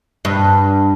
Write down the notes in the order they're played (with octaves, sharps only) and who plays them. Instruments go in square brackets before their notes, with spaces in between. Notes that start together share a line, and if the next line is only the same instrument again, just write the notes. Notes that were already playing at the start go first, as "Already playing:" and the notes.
[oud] G2